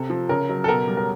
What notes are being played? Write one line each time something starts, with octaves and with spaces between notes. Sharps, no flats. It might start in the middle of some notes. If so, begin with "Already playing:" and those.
Already playing: C3 A4
F3
C#3 A#4
F#3
A4
B2 A#4
G3
A#4